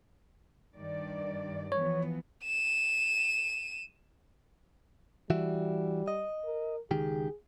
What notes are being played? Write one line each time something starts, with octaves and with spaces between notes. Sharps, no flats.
G2 D#3 D5
E3 F3 B3 C#5
D#7 E7
E3 G3 F#4 E5
D#5
A#4
C#2 D#3 G4 G#4